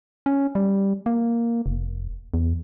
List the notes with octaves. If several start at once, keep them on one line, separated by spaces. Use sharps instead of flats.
C#4
G3
A#3
F1
E2